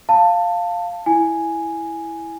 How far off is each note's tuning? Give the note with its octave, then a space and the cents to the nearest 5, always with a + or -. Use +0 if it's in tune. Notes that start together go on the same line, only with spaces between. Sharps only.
F5 +0 A5 +15
E4 +0 G#5 +0